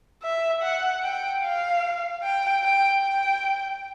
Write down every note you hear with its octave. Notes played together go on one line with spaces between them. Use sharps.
E5
F#5
G5
F5
G5
G5
G5